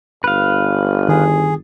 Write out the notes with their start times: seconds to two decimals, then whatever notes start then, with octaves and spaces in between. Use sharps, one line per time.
0.24 G1 B4 F5
1.09 D#3 G#4